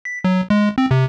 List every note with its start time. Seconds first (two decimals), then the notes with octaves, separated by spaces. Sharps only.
0.05 B6
0.24 F#3
0.50 G#3
0.78 C4
0.91 C3